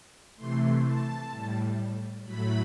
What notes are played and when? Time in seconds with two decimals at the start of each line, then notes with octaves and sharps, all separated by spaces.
0.36 C3 E3 A3 C6
0.84 A5
1.30 A2 G3
2.24 A2 F#3 A3 B5